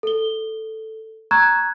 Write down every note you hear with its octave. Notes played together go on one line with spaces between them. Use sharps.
A4 G7
A#5 C#6 E6 F#6 G#6